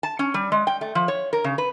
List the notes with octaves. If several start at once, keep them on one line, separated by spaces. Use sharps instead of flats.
A5
C#4
G3
G#3
G5
A3
F3
C#5
A#4
C#3
B4